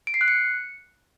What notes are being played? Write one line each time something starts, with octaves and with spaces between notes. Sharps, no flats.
D7
C7
F#6
C#7